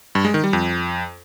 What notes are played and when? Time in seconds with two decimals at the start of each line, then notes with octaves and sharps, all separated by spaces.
0.15 G2
0.25 G#3
0.34 D#3
0.44 G3
0.53 F2